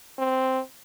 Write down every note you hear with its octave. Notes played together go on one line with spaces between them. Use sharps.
C4